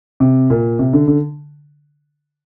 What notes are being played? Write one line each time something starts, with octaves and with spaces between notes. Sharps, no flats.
C3
A#2
C3
D3
D3